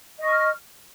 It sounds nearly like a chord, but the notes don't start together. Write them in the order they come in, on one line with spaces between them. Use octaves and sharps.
D#5 C#6 F6